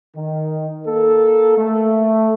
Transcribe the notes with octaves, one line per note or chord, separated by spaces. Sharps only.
D#3
A#3 A4
A3